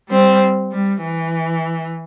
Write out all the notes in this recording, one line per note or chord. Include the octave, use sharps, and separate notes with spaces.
G3 C4
G3
E3